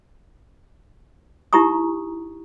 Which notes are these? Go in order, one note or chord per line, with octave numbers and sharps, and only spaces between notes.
D#4 E4 G4 A#5 C#6 D#6